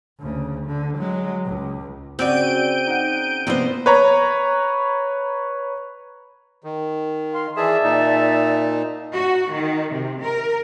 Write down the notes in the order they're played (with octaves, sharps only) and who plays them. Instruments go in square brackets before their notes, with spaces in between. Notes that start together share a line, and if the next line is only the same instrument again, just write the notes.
[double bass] D2 C#3
D3
F#3 G#3
C#2
[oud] C#3 F#4 D5 [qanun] C4 [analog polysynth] G6 D7 D#7
[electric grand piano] D#4 F#5
[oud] C3 F3 D4 [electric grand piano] A#3 B3 [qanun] C5 D#5
[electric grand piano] B4 C#5 A#5
[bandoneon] D#3
[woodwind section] A#4 F5 C6
[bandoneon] E3 G#4 [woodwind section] D5 E5 A5
[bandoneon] A#2 D#4
[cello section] F#4
D#3
C3
A#4